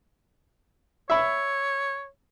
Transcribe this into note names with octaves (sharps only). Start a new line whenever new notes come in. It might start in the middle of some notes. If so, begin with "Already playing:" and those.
C#5 E5 B5